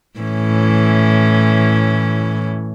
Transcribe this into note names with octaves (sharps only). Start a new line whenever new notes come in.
A2 E3 C#4